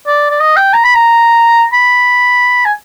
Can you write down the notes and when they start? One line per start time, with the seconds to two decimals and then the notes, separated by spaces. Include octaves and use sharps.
0.07 D5
0.31 D5
0.40 D#5
0.56 G5
0.74 A#5
0.84 B5
0.95 A#5
1.73 B5
2.65 G#5